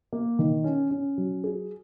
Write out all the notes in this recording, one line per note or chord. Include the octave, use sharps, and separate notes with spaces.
A#3
D#3
C#4
C#4
F#3
G#4